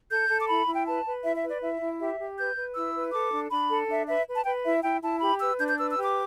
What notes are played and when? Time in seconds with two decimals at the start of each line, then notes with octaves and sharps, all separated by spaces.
0.10 A4 G6
0.29 A4
0.42 D6
0.48 E4 B5
0.67 E4
0.75 G5
0.86 B4 A5
1.06 B4
1.24 E4 E5
1.36 E5
1.43 B4
1.49 D5
1.61 E4 E5
1.80 E4
1.99 G4 E5
2.19 G4
2.38 B4 G6
2.57 B4
2.75 E4 E6
2.95 B4
3.13 A4 D6
3.33 D4
3.52 D4 B5
3.69 A4
3.89 D4 E5
4.08 B4 E5
4.27 B4
4.37 A5
4.45 B4 G5
4.65 E4 E5
4.83 E4 G5
5.02 E4 A5
5.21 G4 B5
5.40 B4 E6
5.59 D4 G6
5.69 G6
5.78 B4 E6
5.90 E6
5.98 G4
6.04 D6